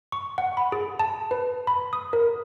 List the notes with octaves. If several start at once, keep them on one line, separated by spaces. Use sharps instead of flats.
C#6
F#5
B5
G#4
A5
B4
B5
D#6
A#4